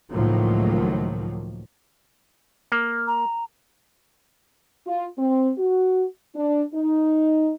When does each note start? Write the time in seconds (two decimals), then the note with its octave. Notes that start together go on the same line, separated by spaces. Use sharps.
0.13 C#2 A2 D#3 F3 F#3 A#3
2.72 A#3
3.07 A#5
4.87 F4
5.18 C4
5.57 F#4
6.35 D4
6.74 D#4